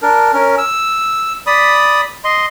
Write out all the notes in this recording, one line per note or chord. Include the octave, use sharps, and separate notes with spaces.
D4 A#4
C#4 A#4
E6
D5 B5 D#6
D#5 C6